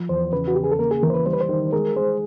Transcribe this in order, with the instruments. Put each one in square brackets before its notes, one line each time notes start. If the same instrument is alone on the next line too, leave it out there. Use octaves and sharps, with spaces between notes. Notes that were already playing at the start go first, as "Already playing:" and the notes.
Already playing: [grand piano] F3
[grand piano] E2 [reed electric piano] C5
[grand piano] C#3 [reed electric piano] B4
[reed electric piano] F#4
[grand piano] C#3 [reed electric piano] G4
[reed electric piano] G#4
A4
[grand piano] A#3 [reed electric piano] A#4
[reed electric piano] G#4
[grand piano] E3 [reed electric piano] A#4
[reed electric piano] C5
B4
[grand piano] G3 [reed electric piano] C5
[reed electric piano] B4
C5
[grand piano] D#3
[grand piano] G#3 [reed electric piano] A#4
[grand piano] G#3 [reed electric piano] C5